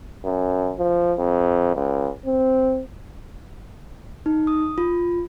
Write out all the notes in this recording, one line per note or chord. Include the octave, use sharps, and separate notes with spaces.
F#2
F3
F2
C#2
C4
D#4
D#6
F4